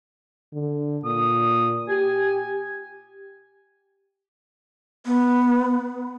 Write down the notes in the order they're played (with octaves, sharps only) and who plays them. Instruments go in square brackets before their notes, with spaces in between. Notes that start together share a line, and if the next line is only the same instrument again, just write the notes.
[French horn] D3
[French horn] A#2 [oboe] D#6
[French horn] G4 [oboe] G#5
[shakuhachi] B3